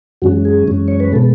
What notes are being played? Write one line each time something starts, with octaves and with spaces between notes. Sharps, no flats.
F#2 E3 G#3 C#4 F#4
G#4
F#2 E3 G#3 C#4
C#5
B4
B2 G#3 B3 A4